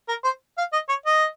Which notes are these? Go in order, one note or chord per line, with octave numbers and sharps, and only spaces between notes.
A#4
C5
F5
D#5
C#5
D#5